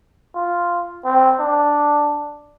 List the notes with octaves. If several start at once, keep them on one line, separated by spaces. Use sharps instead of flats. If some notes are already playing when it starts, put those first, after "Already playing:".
F4
C4
D4